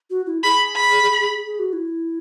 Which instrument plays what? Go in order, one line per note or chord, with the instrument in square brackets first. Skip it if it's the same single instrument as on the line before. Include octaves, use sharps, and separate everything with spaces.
[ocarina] F#4
E4
[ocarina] G#4 [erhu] B5
[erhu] B5
[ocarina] G#4
F#4
E4